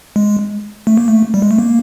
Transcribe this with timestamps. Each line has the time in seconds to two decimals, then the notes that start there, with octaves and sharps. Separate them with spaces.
0.16 G#3
0.87 A3
0.98 A#3
1.08 A3
1.34 G3
1.42 G#3
1.51 A3
1.58 A#3